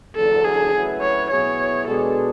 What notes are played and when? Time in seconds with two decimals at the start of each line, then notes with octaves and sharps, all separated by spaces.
0.15 F#1 E2 D3 F#3 A4
0.45 G#4
0.73 C#3 F#3 A3 E4 B4
1.01 C#5
1.30 B2 F#3 B3 E4 G#4 C#5
1.87 B2 G#3 D4 G#4 A4